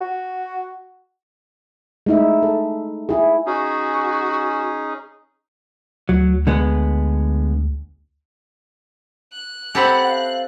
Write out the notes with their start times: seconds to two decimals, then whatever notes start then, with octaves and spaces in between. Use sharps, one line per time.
0.01 F#4
2.06 G#3 A3 D#4 E4 E5
2.43 A4
3.09 E4 G#4
3.46 C#4 D#4 F#4 G#4
6.09 D2 F#3
6.47 D3 G#3 B3
9.33 F#6
9.75 C4 E4 G4 A4 F#5 A#5 B5
10.06 F5